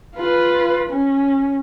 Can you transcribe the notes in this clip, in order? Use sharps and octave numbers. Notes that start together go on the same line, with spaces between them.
F4 B4
C#4